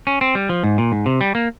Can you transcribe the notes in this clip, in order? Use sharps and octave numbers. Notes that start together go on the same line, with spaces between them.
C#4
C4
G3
F3
G#2
A#2
G#2
C3
G3
A#3